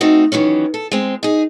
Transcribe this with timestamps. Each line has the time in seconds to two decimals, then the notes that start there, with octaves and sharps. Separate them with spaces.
0.01 A3 C4 D#4 F#4
0.32 D#3 E3 F#3 C#4
0.74 A4
0.92 G#3 C4
1.23 D#4 G#4